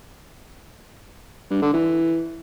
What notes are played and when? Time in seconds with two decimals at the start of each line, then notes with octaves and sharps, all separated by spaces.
1.50 G2
1.62 D3
1.73 E3